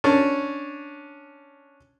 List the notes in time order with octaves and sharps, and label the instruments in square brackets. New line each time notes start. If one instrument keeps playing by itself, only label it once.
[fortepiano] C#4 D4